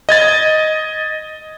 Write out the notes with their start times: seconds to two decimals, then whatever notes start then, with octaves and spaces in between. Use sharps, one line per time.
0.09 D#5 G#6 A6